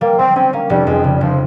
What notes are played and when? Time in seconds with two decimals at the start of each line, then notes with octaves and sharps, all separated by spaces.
0.01 G3 A#3
0.18 G3 C4
0.35 C4 C#4
0.53 A#3 C#4
0.70 F1 G3
0.87 F2 G#3
1.04 C#3 G3
1.15 G3
1.21 F1 F3